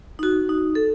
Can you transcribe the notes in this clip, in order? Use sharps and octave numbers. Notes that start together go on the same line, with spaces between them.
D#4
F#4
D#4
A4